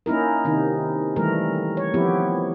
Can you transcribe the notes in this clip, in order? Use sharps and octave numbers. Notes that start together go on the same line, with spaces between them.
A#3 C#4 D#4 E4 A#4
C3 D#3 D#4
D#3 E3 G3 A3 A#4
C#5
F3 B3 C4 E4 G4